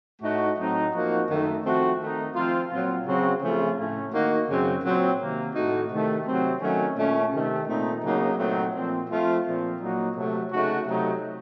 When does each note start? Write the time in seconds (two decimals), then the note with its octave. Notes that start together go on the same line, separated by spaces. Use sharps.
0.22 A2 A3 D#4 F#4
0.59 A2 F#3 C4 D#4
0.93 F3 A#3 D#4 F#4
1.29 F#2 D#3 A3 D#4
1.65 F3 A3 C4 F#4
2.00 D#3 A3 D#4
2.35 F3 C4 F4
2.70 A#2 F#3 C4 F4
3.06 C#3 F#3 C4 F#4
3.41 C#3 F3 A3 C#4 F4
3.77 A2 A3 C#4
4.13 D#3 A#3 D#4 F#4
4.48 F#2 C#3 F#3 C4
4.84 A#2 F#3 C4
5.19 C3 D#3 A#3
5.54 A2 A3 D#4 F#4
5.90 C3 D#3 A3
6.26 C3 F#3 C4
6.61 D#3 F#3 A3 C#4
6.97 A#2 A3 C#4
7.32 C3 D#3 A3
7.68 A#2 A3 C4 D#4
8.04 C#3 F#3 A#3 D#4
8.38 A#2 F#3 A3 C4 D#4
8.74 A#2 F3 C4
9.09 F3 A3 C4 F4
9.45 A#2 F3 C4
9.80 A#2 F#3 A#3 D#4 F#4
10.16 C3 F#3 A3
10.51 C#3 A3 D#4 F#4
10.87 C3 F#3 A3 D#4